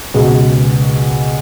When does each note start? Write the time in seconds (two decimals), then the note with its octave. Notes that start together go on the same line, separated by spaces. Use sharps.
0.14 C#2 B2 G#3